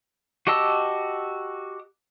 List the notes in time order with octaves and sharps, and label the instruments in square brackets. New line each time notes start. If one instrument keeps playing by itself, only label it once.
[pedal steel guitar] F#4 G4 D#5 A5 E6